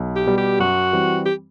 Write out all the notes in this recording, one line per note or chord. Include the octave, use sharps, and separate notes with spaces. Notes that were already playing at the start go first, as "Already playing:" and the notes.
Already playing: B1
G4
B2 G3
G4
F#2 F#4
E3 G3 C4
G4